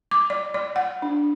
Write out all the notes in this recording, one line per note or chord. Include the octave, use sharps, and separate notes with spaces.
D6
D5
D5
F#5
D4